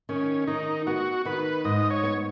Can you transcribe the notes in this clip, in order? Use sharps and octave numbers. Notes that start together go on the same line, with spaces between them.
D#3 C#4
D#3 D#4
B3 F#4
D#3 B4
G#2 D#5
C#5
B3